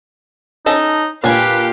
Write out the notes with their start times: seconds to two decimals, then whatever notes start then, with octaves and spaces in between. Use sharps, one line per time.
0.66 C#4 D#4 A4 D#5
1.24 A#2 D4 G4 B4 F5 G#5